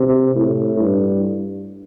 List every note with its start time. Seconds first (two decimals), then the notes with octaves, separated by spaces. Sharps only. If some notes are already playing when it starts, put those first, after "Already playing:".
Already playing: C3
0.36 A2
0.80 G2